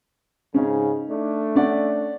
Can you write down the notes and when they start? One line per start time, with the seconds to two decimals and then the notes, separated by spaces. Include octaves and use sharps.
0.54 G#2 C#3 C#4 D#4
1.09 A3 D4
1.56 C#4 D5 F#5